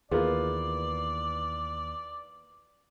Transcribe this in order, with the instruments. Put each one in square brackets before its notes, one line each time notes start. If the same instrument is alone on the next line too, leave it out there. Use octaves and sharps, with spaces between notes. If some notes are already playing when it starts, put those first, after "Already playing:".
[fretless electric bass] D#2 E3 [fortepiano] A#3 B3 F4 [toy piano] G#4 [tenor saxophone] D5